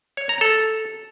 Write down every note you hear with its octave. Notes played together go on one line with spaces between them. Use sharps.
C#5
A#5
A4